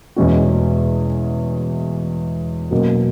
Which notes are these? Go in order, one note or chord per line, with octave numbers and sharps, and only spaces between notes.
E2 B2 G#3 C#4 F#4
B2 F#3 A#3 C#4